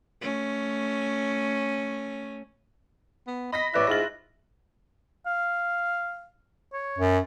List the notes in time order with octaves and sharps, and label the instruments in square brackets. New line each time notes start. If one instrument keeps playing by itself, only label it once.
[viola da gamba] A3 C#4
[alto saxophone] B3
[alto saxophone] D#5 [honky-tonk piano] B5 A#6 B6
[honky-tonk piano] A1 F#6 [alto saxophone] E4 [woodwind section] B4 C#5 D5
[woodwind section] G#2 F4 [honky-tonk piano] A#6 F#7
[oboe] F5
C#5
[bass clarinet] F#2